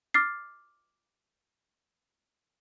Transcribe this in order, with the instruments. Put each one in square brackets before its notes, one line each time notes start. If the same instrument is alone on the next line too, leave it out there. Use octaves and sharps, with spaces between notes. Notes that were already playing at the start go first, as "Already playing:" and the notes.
[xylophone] D6 F6 A6 C7